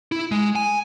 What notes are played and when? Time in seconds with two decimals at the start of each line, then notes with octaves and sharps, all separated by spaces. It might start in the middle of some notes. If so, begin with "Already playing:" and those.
0.12 E4
0.32 G#3
0.55 G#5